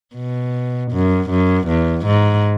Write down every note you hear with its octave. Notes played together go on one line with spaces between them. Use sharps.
B2
F#2
F#2
E2
G#2